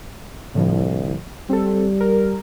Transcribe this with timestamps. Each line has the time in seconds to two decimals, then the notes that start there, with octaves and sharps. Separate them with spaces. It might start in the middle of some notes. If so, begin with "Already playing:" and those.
0.55 C2 A2 D3 F3
1.50 G3 C4 A4
2.00 A#4